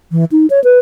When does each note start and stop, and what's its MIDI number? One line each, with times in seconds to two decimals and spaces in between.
0.12 0.25 52
0.32 0.46 63
0.50 0.62 73
0.64 0.79 71